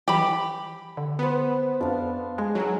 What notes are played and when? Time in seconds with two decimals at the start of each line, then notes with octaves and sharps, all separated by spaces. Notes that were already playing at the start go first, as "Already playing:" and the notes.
0.08 E3 G4 B5
0.97 D3
1.19 B3 B4 C5
1.81 F2 D4 F5
2.38 G#3 G#4
2.55 F#3 D#4 A#4 A#5